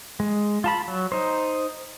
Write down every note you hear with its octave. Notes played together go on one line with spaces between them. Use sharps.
G#3
F4 A5 B5
F#3
D#4 C5